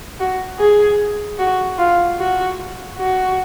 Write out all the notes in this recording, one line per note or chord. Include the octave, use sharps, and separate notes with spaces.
F#4
G#4
F#4
F4
F#4
F#4